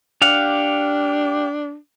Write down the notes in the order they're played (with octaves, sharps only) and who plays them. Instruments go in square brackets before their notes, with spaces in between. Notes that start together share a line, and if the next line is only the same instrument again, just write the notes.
[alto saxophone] D4 [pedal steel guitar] G4 F5 F#5